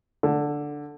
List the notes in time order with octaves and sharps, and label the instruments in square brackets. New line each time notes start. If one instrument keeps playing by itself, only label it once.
[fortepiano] D3